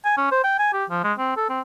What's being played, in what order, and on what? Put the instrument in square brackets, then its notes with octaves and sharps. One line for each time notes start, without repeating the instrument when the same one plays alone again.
[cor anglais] G#5
C#4
C5
G5
G#5
G4
F3
G#3
C4
A4
C4